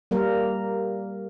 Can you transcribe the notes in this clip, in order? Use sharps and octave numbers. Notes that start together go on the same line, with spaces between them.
G3 A#3 A#4